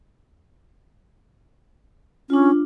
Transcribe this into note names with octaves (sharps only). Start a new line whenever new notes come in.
C#4 D4 F4